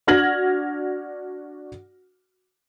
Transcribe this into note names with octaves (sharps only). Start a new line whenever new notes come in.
D4 F#4 F6 G#6 A#6 F#7